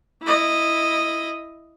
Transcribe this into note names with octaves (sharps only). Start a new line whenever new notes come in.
E4 D#5